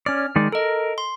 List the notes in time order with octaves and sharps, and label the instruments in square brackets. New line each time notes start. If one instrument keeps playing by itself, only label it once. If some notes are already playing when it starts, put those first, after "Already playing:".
[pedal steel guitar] C#4 D5 [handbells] F6
[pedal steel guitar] D#3 G#3 D5
[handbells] A4 D#5 [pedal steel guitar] A#4
[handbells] C6